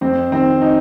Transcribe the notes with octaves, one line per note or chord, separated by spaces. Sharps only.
F2 C4
D#3 C4
D#4